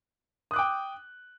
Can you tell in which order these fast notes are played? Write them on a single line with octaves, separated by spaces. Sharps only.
D#6 F#6 D6 G5